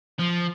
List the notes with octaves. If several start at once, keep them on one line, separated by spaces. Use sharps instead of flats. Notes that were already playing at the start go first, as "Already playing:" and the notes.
F3